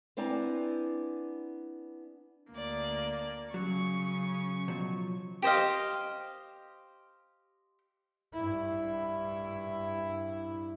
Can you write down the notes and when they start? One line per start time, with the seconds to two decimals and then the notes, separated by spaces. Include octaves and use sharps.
0.17 B3 C4 D4 E4 G#5 A#5
2.53 D2 A#3 D5
3.54 C#3 F#3 C#6
4.68 B2 F3 F#3
5.42 G4 C5 D#5 F5
8.33 G2 E4